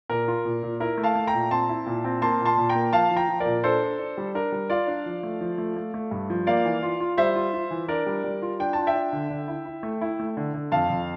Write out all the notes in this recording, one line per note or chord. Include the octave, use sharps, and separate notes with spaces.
A#2 A#4
F4
A#2
A#2
E4 A#4
A3
F5 A5
A3
G5 A#5
A#2
C4 A5 C6
E4
A#2
C4
A#3 A5 C6
A#2
A5 C6
A#2
G5 A#5
A#3
F3 F5 A5
F3
G5 A#5
F3
A#4 D5
A#2
D4 A4 C5
D4
D4
G3
D4 A#4
G3
F4 D5 F5
D4
F3
A3
F3
A3
A3
A3
G2
F3
A#3 D5 F5
E3
F4
F4
G3 C5 E5
F4
F4
E3
D4 A#4 D5
G3
G3
F4
D4 G5
F4 A5
E5 G5
D4
D3
D3
E4
E4
A3
E4
A3
D3
D3
F2 F5 A5
F2